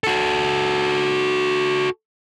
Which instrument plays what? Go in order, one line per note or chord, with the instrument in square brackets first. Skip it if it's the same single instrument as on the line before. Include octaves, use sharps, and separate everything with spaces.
[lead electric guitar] F#4 A4